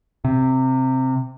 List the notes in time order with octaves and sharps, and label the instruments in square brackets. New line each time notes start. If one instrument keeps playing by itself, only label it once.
[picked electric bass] C3